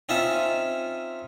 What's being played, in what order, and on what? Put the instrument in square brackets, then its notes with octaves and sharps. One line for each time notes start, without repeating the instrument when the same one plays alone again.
[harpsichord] C4 C#4 D#4 F4 E5